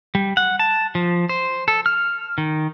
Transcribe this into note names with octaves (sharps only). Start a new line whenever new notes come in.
G3
F#5
A5
F3
C5
A4
F6
D#3